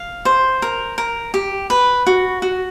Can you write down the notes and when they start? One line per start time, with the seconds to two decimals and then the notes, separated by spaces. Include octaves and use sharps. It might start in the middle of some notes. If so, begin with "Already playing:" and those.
Already playing: F5
0.25 C5
0.62 A#4
0.98 A#4
1.34 G4
1.70 B4
2.07 F#4
2.42 F#4